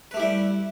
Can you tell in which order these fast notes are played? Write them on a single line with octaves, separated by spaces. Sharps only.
B4 A3 G4 E4 G3